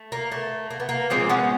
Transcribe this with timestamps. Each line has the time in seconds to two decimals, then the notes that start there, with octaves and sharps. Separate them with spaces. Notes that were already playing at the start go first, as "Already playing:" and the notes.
Already playing: A3
0.12 A#3
0.32 A3
0.70 A#3
0.80 B3
0.89 A#3
1.10 A#2 F3 G#3 A#3 C4
1.29 B3 C#4